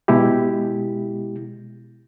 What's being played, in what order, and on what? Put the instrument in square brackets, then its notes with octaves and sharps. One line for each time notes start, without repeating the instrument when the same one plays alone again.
[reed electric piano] B2 G#3 E4 G4